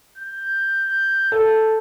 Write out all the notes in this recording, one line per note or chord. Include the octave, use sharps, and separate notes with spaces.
G6
A4